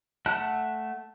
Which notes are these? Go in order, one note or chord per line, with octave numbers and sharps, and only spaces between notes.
A3 E5 F#5 A5 F#6